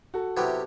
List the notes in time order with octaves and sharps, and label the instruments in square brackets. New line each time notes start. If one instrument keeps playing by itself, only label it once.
[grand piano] F#4 A4
[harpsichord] C3 F#3 B3 E4 G4